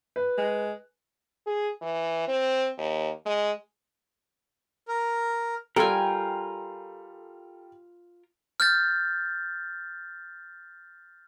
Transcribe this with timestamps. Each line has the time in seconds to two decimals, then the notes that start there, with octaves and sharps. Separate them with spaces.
0.16 B4
0.38 G#3
1.46 G#4
1.82 E3
2.27 C4
2.78 D#2
3.26 G#3
4.88 A#4
5.76 G3 F4 A4 A#4 G5 G#5
8.60 F6 G6 A6